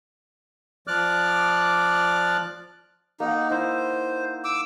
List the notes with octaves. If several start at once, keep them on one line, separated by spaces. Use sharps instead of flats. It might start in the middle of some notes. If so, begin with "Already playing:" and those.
F3 D5 D6 F6 F#6
A#3 D#4 F#5
D#4 E4 C5
D6 E6